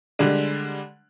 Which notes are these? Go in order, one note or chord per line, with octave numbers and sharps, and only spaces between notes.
D3 G3 G#3 D4